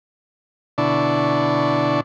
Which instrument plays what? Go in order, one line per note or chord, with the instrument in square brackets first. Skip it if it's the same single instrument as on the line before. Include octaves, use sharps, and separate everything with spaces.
[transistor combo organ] B2 D3 D4 E4 D5 C#6